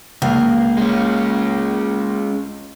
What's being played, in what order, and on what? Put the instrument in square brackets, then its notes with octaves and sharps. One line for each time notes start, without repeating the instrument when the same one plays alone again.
[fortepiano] C#2 [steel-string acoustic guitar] A#3
[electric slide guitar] G#3 C#4